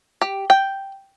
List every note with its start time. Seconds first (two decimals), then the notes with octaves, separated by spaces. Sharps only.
0.21 G4
0.50 G5